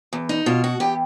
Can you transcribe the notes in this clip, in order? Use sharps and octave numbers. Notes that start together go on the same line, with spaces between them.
E2
D#4
B2 F4
F#4
E2 G4